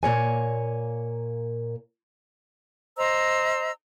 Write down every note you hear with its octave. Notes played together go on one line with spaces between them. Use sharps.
A#2 A#3 C#5 G#5
C5 D#5 A#5 E6